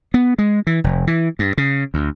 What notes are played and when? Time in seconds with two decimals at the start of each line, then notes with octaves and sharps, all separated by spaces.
0.14 B3
0.38 G#3
0.67 E3
0.84 F1
1.07 E3
1.39 G2
1.58 C#3
1.94 D2